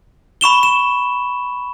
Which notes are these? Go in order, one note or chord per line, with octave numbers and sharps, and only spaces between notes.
B5 C#6 E7 G7
E7